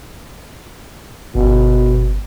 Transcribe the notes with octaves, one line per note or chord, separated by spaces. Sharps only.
G1 B2